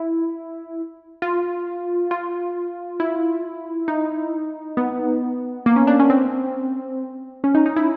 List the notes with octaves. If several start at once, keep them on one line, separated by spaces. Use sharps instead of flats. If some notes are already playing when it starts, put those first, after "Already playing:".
Already playing: E4
F4
F4
E4
D#4
B3
A#3
C#4
D4
C#4
C4
C#4
D#4
D#4
E4